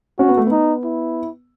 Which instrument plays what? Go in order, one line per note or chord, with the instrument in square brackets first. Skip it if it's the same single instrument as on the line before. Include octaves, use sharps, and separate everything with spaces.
[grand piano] C#4 [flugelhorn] F#4
[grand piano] B3
A3
[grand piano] B3 [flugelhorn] D#4
[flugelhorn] E4